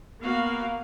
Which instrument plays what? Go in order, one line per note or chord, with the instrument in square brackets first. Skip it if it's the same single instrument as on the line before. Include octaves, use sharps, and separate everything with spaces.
[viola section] A#3 B3 F5 [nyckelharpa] F#4